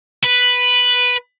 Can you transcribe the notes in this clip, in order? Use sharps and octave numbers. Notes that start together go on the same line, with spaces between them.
B4